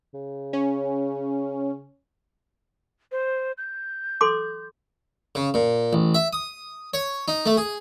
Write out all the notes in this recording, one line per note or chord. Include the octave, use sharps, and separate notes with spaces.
C#3
C#4
C5
G6
A4 C6 D6
C#3
A#2
A1
E5
D#6
C#5
D#4
A3
G#4